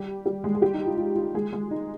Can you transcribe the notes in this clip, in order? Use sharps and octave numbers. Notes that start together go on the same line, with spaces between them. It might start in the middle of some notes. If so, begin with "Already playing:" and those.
Already playing: G3 G4
G3 G4
G#3 G#4
G#4
G3 G4
D#4
F4
F4
F4
G#3 G#4
G#3 G#4
D#4